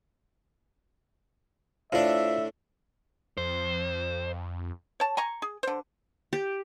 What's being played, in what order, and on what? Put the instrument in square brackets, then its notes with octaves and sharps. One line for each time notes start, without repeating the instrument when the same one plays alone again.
[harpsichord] A2 D4 [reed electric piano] F4 C5 F5 [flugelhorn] E5
[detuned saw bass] F2 [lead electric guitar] C5
[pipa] C#5 A5
G#5 A#5 C#6
G#4
D3 C5
[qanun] G4